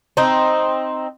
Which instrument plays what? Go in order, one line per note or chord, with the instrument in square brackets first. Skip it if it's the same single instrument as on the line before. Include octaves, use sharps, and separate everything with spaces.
[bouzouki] C4 D#4